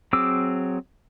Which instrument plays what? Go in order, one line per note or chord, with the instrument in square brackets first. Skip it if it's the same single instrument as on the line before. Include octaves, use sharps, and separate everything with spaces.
[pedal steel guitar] F#3 C4 G#4 D6 E6